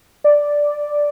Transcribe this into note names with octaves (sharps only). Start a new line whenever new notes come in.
D5